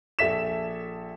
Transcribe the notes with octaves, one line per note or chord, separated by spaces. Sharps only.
A#1 A4 E5 B6 E7